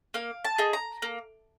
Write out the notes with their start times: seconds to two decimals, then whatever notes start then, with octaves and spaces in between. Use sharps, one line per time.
0.14 A#3 F5
0.45 A5
0.58 D#4 G#4
0.73 A#5
1.02 A#3